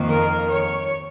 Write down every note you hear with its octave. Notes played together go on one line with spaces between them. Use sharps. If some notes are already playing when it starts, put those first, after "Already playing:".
Already playing: F2 D#3 A#3
A#4
C#5